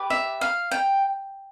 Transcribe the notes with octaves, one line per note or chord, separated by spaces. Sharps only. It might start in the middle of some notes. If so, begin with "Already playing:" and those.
Already playing: G4 B4 D5
E5
F5
G5